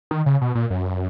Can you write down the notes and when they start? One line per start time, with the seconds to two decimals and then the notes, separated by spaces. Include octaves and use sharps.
0.11 D#3
0.26 C#3
0.41 B2
0.55 A#2
0.70 F#2